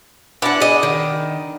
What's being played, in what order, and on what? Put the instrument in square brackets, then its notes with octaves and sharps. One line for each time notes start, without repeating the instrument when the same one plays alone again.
[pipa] D3 B3 D4 [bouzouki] E4 F#5
[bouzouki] G#4 D#5
D#3